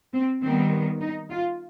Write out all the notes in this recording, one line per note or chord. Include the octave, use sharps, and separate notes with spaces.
C4
D#3 G3 B3 C4
D#4
F4